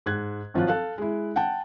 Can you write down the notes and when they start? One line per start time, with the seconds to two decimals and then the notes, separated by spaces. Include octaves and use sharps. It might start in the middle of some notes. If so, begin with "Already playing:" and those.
0.06 G#2 F#6 G#6
0.54 G#1 F3 F#3 F4 F#6
0.68 A4 F5 F#6
0.98 G#3 E4
1.36 F#5 G5 A5